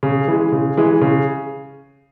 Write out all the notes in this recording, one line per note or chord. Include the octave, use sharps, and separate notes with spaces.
C#3
E3 G#3
C#3
E3 G#3
C#3